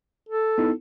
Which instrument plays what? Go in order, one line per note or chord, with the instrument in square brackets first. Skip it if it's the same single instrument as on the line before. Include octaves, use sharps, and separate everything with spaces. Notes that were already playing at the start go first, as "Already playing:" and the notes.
[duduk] A4
[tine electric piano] B3 D#4 E4